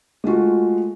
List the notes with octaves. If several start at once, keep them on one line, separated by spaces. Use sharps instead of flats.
G#3 A3 F4 F#4